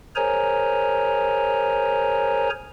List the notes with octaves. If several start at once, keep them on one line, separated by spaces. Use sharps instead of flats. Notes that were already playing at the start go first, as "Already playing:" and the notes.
G#4 A#4 C5 C#5 G#5 A#5